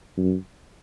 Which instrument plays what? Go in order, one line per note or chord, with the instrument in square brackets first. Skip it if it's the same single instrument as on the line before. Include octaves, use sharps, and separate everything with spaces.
[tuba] F#2